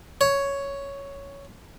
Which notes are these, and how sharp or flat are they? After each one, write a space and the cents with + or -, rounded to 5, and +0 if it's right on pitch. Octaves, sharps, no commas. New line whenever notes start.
C#5 +5